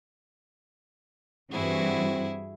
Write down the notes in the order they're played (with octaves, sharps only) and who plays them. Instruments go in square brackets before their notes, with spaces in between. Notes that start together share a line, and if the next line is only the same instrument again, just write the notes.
[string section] G2 E3 F#4 [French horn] C4 [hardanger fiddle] E4 G#4